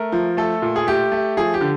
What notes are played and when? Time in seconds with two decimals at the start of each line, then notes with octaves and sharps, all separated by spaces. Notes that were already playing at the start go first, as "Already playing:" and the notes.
Already playing: A3 A#4
0.12 F3
0.37 A3 A4
0.62 A#2
0.76 G#4
0.87 A3 G4
1.12 A3
1.37 F3 G#4
1.54 G4
1.61 D3